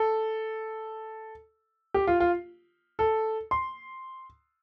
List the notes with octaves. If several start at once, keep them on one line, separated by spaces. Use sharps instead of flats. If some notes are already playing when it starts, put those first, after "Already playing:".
Already playing: A4
G4
F4
F4
A4
C6